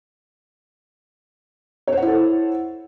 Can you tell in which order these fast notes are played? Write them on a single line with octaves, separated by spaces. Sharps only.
C#5 C5 F#5 E4 A4